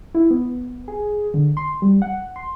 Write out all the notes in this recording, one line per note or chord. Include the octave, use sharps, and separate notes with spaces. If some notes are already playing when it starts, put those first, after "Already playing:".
E4
B3
G#4
D3
C6
G3
F#5
C6